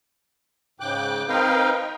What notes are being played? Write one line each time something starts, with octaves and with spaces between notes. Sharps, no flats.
G#2 C#3 G5 D6 F#6
C4 D#4 A#4 B4 F5 G5